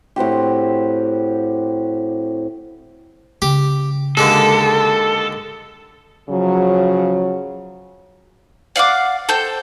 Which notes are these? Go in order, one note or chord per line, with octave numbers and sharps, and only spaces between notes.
A2 C4 F#4 G4
C#3 G4
D#2 D3 G#3 A4
C#3 F3 F#3
D5 F5 F#5 D6
A4 C5 G5